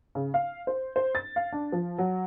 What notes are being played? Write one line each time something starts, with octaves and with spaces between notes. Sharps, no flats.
C#3
F5
C5
C5
A6
F5
D4
F3
F#3